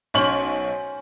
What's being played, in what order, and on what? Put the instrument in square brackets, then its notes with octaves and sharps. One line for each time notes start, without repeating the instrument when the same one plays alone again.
[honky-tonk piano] B1 C#5 F#7 [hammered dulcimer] C#4 C5